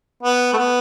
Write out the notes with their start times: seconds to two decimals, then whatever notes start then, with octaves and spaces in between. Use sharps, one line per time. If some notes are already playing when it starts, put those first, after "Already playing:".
0.23 B3
0.53 A3
0.57 B3